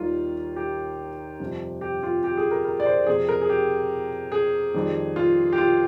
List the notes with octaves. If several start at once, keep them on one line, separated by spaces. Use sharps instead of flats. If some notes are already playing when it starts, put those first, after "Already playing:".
Already playing: D#2 D#3 G3 F4
G4
F2 C3 G3
G4
F4
G4
G#4
A#4
A#4
D5
C5
F2 C3 F3 G#4
A#4
G#4
G4
G#4
F2 D#3 G3
F4
G4
F4